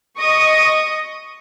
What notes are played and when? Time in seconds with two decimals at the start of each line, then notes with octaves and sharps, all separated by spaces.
0.17 D#5 C#6 D#6 A#6